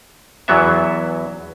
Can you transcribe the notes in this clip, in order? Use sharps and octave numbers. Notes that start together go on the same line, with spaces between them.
E2 E3 F#3 B3 E5